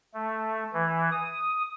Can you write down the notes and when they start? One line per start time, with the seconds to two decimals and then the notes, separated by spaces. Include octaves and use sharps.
0.14 A3
0.73 E3
1.12 D#6